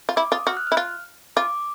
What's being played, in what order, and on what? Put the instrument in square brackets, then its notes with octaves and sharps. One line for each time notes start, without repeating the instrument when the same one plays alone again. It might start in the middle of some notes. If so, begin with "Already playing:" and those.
[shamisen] F4
[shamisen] E4 [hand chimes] D6
[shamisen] F4 [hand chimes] D#6
[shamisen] F#4 [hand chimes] F6
[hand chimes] F#6
[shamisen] E4 [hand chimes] F6
[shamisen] F4
[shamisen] F4 [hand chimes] D6